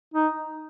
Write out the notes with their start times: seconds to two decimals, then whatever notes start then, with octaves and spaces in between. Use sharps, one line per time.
0.14 D#4